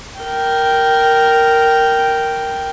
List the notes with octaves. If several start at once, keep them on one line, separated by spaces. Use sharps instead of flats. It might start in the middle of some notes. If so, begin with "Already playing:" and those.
A#4 G5